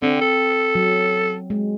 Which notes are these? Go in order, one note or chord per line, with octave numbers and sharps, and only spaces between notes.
D3 C4
A4
F#3
G#3